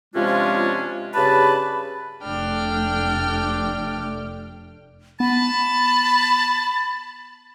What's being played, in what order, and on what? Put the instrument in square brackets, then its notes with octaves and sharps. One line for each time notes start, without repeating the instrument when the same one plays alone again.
[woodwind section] C3 F3 G#3 C#4 D4 F4
G2 C#3 G4 B4 A5 B5
[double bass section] F1 A3 [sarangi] D4 [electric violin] G5 F6
[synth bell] B3 [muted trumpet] A5 [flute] B5